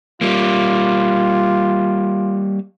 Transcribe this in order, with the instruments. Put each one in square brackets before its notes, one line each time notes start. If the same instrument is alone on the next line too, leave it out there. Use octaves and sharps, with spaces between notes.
[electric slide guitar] G3 A#3 [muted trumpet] F4